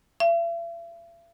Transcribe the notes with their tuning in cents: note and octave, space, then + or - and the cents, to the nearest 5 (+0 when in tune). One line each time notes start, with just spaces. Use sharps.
E5 +45